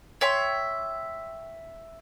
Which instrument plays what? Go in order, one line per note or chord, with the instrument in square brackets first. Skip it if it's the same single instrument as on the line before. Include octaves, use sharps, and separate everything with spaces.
[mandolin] C#5 E5 G5 C6